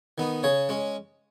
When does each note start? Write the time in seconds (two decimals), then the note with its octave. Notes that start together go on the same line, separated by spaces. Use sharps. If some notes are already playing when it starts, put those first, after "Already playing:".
0.18 D#3 B3 D#4
0.43 C#3 G#4 C#5
0.69 G#3 C#4